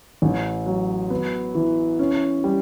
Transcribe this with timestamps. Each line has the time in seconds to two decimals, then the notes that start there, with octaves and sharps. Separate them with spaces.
0.22 A1
0.66 F#3
1.10 B3
1.55 E3
1.99 C#4
2.44 G3